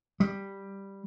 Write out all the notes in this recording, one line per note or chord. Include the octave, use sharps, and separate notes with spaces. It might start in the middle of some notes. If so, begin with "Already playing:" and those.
G3